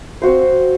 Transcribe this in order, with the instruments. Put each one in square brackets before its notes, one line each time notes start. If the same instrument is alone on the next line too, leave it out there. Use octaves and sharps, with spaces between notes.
[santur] C4 F#4 C5